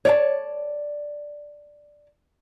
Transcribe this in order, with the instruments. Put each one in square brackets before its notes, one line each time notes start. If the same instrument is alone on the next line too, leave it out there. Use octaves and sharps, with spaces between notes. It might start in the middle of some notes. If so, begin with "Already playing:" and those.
[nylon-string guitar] C#5 D5 E5 A5